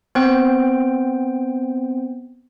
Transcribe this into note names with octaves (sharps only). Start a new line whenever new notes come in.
B3 C4 C5 G5